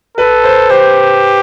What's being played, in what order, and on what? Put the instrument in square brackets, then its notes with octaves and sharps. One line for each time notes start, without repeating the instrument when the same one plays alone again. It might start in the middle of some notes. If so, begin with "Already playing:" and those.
[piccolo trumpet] A4 [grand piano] B4
[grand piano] C5
[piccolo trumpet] G4 [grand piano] C5